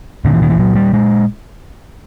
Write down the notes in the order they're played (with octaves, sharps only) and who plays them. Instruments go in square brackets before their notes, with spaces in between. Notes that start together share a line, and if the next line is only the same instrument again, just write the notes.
[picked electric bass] A#2 D3
E3
D#3
E3
A#2 F#3
G3
A#2 G#3